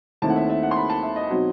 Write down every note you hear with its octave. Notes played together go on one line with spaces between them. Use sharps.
D#2 D#3 A3 C4 E4 A5
F#5
E5
E5
F#5
C6
B5
A5
E5
D#5
B2 F#3 C4 D#4